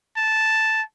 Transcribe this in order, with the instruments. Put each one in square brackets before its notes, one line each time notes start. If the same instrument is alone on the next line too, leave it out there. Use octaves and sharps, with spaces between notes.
[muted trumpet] A5